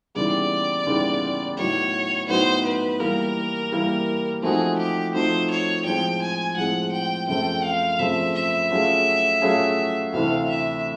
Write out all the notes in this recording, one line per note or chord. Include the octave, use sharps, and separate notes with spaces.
D#2 C#3 E3 G3 B3 D5
D#2 C#3 E3 G3 B3
A2 F#3 B3 D#4 F#4 C#5
A2 F#3 B3 D#4 F#4 C5
B4
E3 G3 A#3 A#4
E3 G3 A#3
F3 A3 C4 D#4 F#4 G#4
G4
F3 A3 C4 D#4 F#4 C5
C#5
A2 F3 G#3 C4 G5
G#5
A2 F3 G#3 C4 F#5
G5
F#2 C#3 F3 A3 C4 G5
F5
F#2 C#3 F3 A3 C4 E5
E5
F#3 A3 C#4 F4 G#4
F#3 A3 C#4 F4 G#4
D2 C3 E3 A3 F5
E5